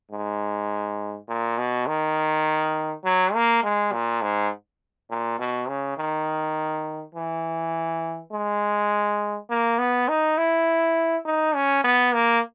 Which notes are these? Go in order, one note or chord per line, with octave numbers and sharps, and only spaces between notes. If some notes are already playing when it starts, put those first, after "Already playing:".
G#2
A#2
B2
D#3
F#3
A#3
G#3
A#2
G#2
A#2
B2
C#3
D#3
E3
G#3
A#3
B3
D#4
E4
D#4
C#4
B3
A#3